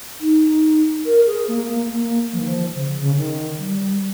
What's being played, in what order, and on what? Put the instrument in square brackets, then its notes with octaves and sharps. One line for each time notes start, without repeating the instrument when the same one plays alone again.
[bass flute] D#4
A#4
G#4
A#3
A#3
A#3
F3
D#3
F3
C#3
C#3
D#3
G3